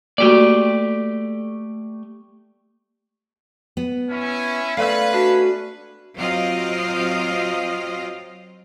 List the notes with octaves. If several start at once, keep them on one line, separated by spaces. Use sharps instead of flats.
A3 A#3 F#4 G4 D5
B3
C#4 E4
A3 C#4 B4 D5 F5 C6 E6
D4 F#4
F#3 C4 F4 D#5 F5